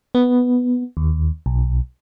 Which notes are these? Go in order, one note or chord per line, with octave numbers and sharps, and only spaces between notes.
B3
D#2
B1